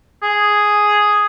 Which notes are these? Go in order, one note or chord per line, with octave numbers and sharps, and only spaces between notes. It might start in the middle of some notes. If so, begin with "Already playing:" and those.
G#4